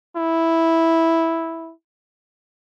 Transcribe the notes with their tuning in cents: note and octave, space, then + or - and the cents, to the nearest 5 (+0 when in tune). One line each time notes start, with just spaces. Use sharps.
E4 -5